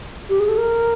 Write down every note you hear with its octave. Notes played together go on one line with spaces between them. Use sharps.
G4
G#4
A4
A#4